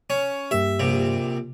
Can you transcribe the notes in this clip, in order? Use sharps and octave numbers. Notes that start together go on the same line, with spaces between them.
C#4
G2 A#3 G4 E5
A#1 C3